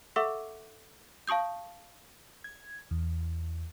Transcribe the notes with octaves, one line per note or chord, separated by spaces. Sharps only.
A4 E5 F#5 C#6 D6 E6
F5 A5 C#6 D#6 G6
G#6
E2